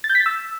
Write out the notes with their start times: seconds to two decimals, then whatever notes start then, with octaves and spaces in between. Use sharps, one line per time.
0.04 A6
0.10 G6
0.15 B6
0.20 A6
0.26 E6